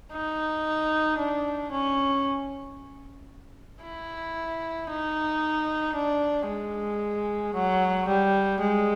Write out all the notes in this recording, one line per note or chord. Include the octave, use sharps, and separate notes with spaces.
D#4
D4
C#4
E4
D#4
D4
G#3
F#3
G3
G#3